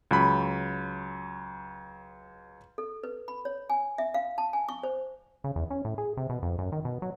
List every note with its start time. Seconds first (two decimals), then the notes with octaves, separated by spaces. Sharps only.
0.11 C#2 F#3 B5
2.78 A4
3.04 B4
3.28 B5
3.45 C#5
3.70 G#5
3.98 E5
4.14 F5
4.38 A5
4.53 G#5
4.69 C#6
4.83 C5
5.44 C#3
5.56 E2
5.70 C#4
5.85 A2
5.98 G#4
6.17 C3
6.29 B2
6.42 F2
6.58 F#2
6.72 D#3
6.85 B2
7.02 F#3